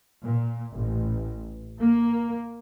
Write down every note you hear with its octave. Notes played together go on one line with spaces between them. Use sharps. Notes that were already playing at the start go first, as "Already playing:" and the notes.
A#2
A1
A#3